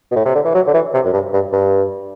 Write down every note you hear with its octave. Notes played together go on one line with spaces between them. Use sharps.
B2
A2
C3
D3
E3
F#3
D3
E3
C3
F#2
G2
G2
G2